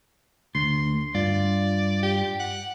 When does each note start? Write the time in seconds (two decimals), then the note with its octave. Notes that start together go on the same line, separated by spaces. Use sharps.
0.55 D2 C6
1.15 G2 F4 D5
2.03 G4
2.40 F#5